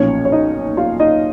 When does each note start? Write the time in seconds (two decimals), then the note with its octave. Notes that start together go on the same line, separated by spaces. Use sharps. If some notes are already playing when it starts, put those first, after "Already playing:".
Already playing: B1 A#2 F3 C#4 C#5
0.25 C#5
0.32 D#4 D#5
0.77 F4 F5
0.99 D#4 D#5